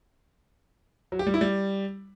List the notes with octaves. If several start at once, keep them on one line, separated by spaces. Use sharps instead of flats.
F#3
G4
G3
E4
G3